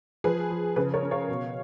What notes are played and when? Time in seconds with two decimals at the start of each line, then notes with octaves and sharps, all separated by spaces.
0.24 F3 G#4 B4
0.50 F3
0.76 C#3 G#4 B4
0.94 A#4 C#5
1.02 C#4
1.11 C#5 F5
1.29 B2